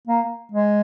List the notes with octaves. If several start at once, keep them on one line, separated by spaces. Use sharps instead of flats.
A#3
G#3